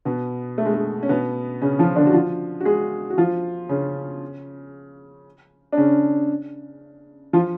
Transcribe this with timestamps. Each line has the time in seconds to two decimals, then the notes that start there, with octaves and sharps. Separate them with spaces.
0.05 B2 B3
0.58 A3
0.65 G#3
0.74 A3
1.03 C#4
1.09 B2 B3
1.62 C#3 C#4
1.79 F3 F4
1.96 D3 D4
2.07 F#4
2.13 F3 F4
2.61 F#4
2.65 G#3 G#4
3.10 F#4
3.18 F3 F4
3.69 C#3 C#4
5.72 D4
5.77 C#3 C#4
7.33 F3 F4